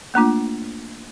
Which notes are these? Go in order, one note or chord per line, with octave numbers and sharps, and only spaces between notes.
A3 A#3 D4 F4